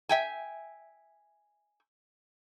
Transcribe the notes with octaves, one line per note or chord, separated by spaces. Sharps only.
E5 G5 G#5